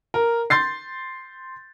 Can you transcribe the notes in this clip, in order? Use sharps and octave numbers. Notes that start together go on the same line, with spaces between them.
A#4
C6 G6 A6 C7